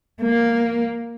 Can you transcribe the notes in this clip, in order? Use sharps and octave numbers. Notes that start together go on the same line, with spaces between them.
A#3